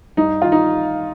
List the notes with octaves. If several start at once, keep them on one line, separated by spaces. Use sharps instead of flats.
G2 D#4
D#3 F4
D#4